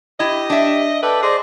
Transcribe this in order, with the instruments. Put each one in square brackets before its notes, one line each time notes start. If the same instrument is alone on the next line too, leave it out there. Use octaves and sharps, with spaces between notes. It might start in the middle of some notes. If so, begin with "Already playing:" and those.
[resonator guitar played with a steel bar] E4 [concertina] G4 [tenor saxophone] D#5
[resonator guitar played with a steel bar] D4 E5
[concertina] A4 D5 G5 [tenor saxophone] B4
[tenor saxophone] G#4 [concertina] C5 D5 D#5